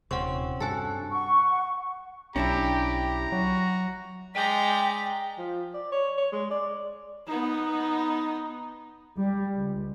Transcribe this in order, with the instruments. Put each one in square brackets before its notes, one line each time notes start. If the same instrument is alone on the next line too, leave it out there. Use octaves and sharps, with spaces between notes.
[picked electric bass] D#1 [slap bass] C3 [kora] C4 C#4 [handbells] F#5 C#6
[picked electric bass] G2 [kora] F#4 A4 [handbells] G#5 A5
[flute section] F#5 C#6
[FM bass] B1 [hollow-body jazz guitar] C#4 D4 E4 [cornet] G4 [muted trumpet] A#5
[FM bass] F#3 [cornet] F#4
[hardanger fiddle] G#3 [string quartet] D5 A#5 G6 [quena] G5 [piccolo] B6
[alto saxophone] F3
D5
C#5
C#5
G#3
D5
[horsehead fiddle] B3 D#4
[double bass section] G3
C#2